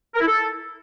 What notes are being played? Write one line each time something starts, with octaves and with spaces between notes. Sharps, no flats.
A#4
E4
A4